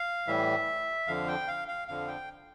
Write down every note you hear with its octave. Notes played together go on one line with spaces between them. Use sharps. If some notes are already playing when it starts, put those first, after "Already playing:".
Already playing: F5
A2 E3 G3 E5
F2 D3 F3 F5
G5
F5
F5
F2 D3 F3 F5
G5